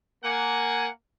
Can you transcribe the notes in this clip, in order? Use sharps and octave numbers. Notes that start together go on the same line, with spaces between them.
A#3 F#5 G#5